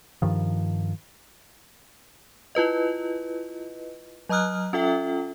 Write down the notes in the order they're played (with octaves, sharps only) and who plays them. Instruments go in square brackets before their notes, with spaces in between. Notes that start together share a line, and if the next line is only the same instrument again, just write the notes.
[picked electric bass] G2 D#3 F3
[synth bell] E4 F4 B4 D#5
F#3 D#5 A#5 D#6 F6 F#6
C#4 F4 A4 E5 G5